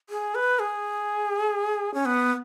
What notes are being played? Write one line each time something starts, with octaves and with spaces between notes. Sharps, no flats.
G#4
B4
G#4
C#4
B3